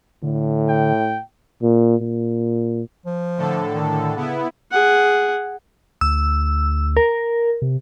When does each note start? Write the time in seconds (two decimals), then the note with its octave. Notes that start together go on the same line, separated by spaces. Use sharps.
0.23 A2 D3
0.69 G5
1.62 A#2
2.01 A#2
3.06 F3
3.37 A2 D3 A4
3.75 D#3
4.16 C#3 B3 E4
4.72 G#4 F#5
6.01 D2 E6
6.97 A#4
7.62 C3